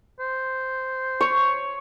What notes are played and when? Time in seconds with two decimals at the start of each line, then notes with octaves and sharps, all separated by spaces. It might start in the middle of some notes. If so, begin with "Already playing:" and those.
0.20 C5
1.21 C#5